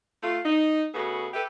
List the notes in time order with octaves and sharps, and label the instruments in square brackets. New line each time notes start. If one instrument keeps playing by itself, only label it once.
[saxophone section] A3 F4
D#4
C#3 A3 B3 F#4 G#4
G4 A4 B4 E5